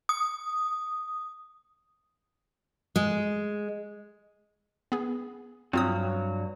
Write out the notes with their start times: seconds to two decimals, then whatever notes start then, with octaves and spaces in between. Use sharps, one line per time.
0.09 D#6
2.96 G#3
4.92 B3 G#4
5.73 G2 F#3 C4 F4 D#6